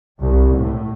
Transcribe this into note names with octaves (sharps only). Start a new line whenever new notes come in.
C2
A2